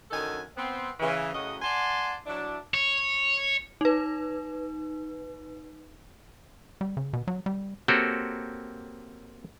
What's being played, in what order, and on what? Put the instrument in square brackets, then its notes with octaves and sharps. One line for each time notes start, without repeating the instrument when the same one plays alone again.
[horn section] F#2 D3 D#3 F#3 A4 G#5
B3 C4
C#3 E3
F#2 A2 C#3 F#4 D#5
D5 F#5 G#5 A5 C6
F#3 D4 E4
[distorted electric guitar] C#5
[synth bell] D#4 B4
[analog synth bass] G3
C#3
B2
F#3
G3
[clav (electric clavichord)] A#3 C4 F#4 G4 A4 C#5